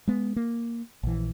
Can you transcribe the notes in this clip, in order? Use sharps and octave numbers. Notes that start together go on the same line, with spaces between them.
G#3 B3
A#3
A#1 E3